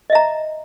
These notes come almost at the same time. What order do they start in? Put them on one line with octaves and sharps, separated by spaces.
D#5 E5 A#5